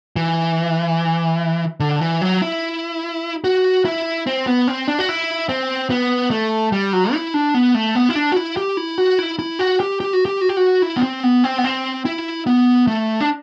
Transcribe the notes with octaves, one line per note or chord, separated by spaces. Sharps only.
E3
D3
E3
F#3
E4
F#4
E4
C4
B3
C4
D4
F#4
E4
C4
B3
A3
G3
F#3
E4
D4
B3
A3
B3
E4
D4
F#4
E4
G4
E4
F#4
E4
E4
F#4
G4
G4
F#4
G4
F#4
G4
F#4
E4
B3
C4
B3
C4
B3
C4
E4
B3
A3
D4